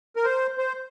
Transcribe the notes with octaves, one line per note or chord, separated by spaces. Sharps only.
A#4
C5
C5